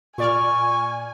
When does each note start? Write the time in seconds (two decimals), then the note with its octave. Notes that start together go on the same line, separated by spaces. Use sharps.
0.18 A#2 D5 G#5 C#6 F6